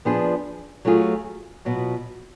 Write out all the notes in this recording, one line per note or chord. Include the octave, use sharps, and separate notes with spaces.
F3 B3 D4 G#4
F#3 A3 F4 G#4
B2 F#3 B3 F4